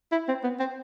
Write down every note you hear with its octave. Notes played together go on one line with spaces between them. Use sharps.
E4
C4
B3
C4